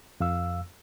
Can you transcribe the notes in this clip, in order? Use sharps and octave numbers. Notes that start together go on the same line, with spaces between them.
F2 F5 E6